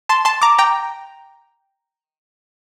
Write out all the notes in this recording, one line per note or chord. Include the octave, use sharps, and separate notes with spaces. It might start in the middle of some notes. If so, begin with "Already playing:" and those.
A5 C6
A5 C6
A#5 D6
G5 A#5